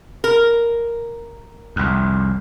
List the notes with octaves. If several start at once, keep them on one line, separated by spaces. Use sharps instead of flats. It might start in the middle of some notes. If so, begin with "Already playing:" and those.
A#4
C2 F2